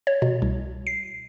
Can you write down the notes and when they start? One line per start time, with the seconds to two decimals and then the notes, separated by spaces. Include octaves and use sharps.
0.07 C#5
0.22 B2
0.42 C2
0.87 C7